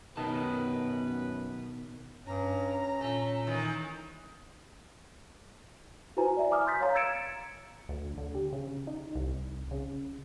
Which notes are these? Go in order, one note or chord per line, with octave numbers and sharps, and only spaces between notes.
F#2 B2 D#3 B3 B4 A5
G2 C#4 A#5
A#2 A3
D#3 E3
E4 F#4 B4 C5 G#5 A#5
D5 E5
G#5 A#5 D6 D#6 F6
C6 D#6 G6 A6 B6
C#5 F5 A#5
E6 G#6 A6 C#7 D7 E7
D2
D3
G4
C#3
D#4
C2
C#3